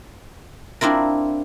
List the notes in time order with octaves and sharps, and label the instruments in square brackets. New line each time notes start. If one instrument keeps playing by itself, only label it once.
[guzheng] C4 D4 E4 F4 A#4